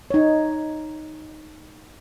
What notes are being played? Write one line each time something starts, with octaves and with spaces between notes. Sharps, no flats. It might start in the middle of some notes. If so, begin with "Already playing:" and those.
D#4 C#5